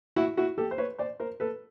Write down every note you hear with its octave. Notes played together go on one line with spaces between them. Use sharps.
E4 F#4
E4 F#4
G4 A4
C5
B4 C#5
C5 D5
A#4 C5
A4 B4